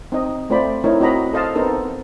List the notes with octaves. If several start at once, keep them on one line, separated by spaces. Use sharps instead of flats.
C4 D#4 D#5
A3 C4 F4 C5 D5 B5
A3 C4 D#4 E4 A#4 C#5
C4 F#4 D#5 A#5 B5
A4 C5 D#5 F5 A5
B3 C4 D#4 A4 A#4 C5